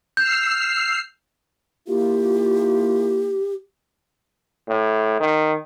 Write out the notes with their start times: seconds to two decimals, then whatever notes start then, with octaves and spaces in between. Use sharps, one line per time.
0.17 E6 F6 G6 C7
1.88 A#3 E4 F4 G4
4.69 A2
5.20 D#3